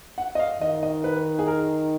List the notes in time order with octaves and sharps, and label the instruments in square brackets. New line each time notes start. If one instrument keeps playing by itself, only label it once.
[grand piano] F#5
D#5
F5
[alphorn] D#3 [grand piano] D#5
[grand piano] D#5
B4
G#4
A#4